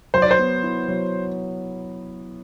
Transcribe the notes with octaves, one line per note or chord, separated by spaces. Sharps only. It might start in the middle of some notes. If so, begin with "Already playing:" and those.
F#3 C5
D5
C5
B3
E4
F#3